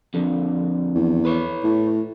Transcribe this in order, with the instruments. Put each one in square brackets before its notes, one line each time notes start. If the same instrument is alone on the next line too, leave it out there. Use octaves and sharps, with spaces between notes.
[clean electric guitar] F2 D3
[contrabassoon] E2
[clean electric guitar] B4 C#5
[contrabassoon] A2